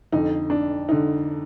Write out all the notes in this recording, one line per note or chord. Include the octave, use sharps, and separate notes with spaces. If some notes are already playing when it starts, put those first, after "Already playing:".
F2 D3 D#4
D4
D3 D#4